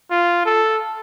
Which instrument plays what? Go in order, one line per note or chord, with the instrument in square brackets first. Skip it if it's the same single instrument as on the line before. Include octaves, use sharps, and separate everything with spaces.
[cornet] F4
A4